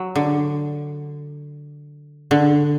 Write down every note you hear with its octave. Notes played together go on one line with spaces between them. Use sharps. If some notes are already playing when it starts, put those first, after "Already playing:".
Already playing: F#3
D3
D3